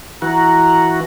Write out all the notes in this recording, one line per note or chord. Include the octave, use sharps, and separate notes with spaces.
E3 F#4 A#5